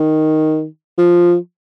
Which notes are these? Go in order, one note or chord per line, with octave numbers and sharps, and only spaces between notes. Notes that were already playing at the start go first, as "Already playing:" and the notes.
Already playing: D#3
F3